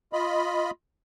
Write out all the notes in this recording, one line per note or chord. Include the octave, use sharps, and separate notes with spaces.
F4 D#5 B5